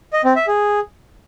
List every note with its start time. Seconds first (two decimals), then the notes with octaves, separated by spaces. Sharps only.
0.13 D#5
0.24 C4
0.36 E5
0.47 G#4